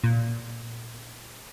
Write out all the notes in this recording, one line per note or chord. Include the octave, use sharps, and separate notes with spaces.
A#2